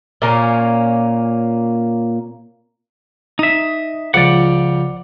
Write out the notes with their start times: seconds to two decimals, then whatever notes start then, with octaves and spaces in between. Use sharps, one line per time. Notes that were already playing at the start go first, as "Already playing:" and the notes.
0.22 A#2 A#3 C#4
3.39 D#4 E5 D#6
4.14 C#2 F3 D5 F#5 D6